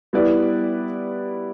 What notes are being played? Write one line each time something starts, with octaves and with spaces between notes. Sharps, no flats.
G3 B3 E4 B4 D5